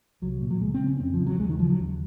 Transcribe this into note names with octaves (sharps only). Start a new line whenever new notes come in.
C2 F#3
A#2
F#3
C#2 G#3
C4
C#3
C#4
F2 C4
F3
C#3
F#3
D#2 G#3
D#3
C#3 F3
F#3
D#2